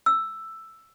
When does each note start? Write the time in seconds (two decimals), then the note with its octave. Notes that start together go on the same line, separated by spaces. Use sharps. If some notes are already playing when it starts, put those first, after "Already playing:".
0.06 E6